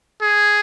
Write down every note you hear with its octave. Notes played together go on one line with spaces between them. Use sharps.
G#4